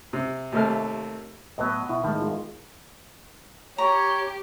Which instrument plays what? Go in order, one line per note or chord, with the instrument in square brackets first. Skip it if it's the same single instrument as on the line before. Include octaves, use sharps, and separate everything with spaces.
[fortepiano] C3
D#2 C3 A3 A#3 F6
[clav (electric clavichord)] A2 F#3 [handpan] B3 B4 D#5
[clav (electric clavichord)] B2 [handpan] E4
[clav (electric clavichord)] A2 F3 [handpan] D#3 G#3
[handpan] G#3 F4
[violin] G4 [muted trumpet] C#5 [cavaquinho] A#5